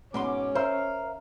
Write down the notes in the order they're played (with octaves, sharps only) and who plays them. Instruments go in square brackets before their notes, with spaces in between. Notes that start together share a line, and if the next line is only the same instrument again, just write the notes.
[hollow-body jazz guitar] G#2 B2 C6 [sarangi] C#4 [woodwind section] D6
[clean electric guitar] A#4 E5 [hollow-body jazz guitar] C5 [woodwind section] F5